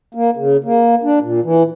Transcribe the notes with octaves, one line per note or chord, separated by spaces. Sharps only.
A#3
C#3
A#3
D4
A#2
E3